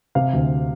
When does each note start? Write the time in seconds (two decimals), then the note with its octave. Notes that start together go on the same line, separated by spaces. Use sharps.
0.15 C3 F5
0.33 D2